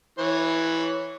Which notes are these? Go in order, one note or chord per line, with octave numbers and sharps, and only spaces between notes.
E3 C#5